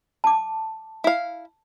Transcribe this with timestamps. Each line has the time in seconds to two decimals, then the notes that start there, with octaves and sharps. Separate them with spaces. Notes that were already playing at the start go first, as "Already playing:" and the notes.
0.24 A5 D6
1.04 E4 F5